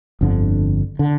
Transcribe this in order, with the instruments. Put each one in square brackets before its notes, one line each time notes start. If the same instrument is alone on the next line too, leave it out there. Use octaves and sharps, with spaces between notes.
[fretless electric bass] G1 F2 D3
D3